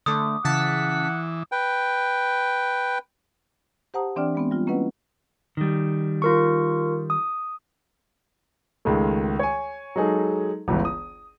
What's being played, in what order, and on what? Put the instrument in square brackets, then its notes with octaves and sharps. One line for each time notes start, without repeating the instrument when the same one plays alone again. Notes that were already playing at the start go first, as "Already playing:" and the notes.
[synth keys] D3 A3 [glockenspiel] D6 D#6
[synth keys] C#3 A5 B6 [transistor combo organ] E3 [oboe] F#5
[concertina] B4 G5
[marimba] G4 C5 F#5 A5 A#5 D#6
E3 C4 D4 D5 G5 F6
G#3 B3 C4
G3 F4
A#3 C#4 E4 B4 D#5 F#5
[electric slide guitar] D#3 G3
[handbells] F4 A#4 C#6
D#6
[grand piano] C#2 D#3 G#3 A3
C#5 G#5
F#3 G#3 D#4 G#4 A4
G1 C#2 E3
D#6